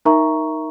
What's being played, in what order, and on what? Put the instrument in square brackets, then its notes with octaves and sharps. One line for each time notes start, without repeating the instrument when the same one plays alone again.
[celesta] D#4 A#4 E5 A#5 C#6